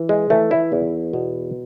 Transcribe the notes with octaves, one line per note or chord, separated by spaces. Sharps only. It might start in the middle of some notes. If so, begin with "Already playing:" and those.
Already playing: E3
G#3
E3 A3
E4
E2
B2